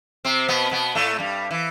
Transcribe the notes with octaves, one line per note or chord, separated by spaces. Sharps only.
C3 C4
B2 B3
B2 B3
A2 A3
G2 G3
E3